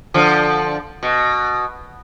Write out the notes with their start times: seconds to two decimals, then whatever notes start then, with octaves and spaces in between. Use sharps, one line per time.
0.14 D3 F3
1.03 B2